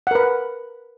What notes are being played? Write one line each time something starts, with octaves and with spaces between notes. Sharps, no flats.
A#4 B4 F#5